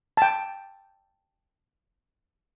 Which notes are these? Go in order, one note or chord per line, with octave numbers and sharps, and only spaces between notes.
G5 A5